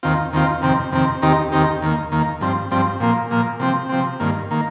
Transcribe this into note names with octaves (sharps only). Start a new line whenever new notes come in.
D#2 D#3 C4 F4
D#2 D#3 C4 F4
F2 C3 D#3 C4
F2 C3 D#3 C4
D#2 D#3 C4 D#4 G4
D#2 D#3 C4 D#4 G4
D#2 D#3 A#3
D#2 D#3 A#3
G2 F3 C4
G2 F3 C4
A#2 F3 A#3
A#2 F3 A#3
C3 F3 C4
C3 F3 C4
G2 D#3 A#3
D#3 A#3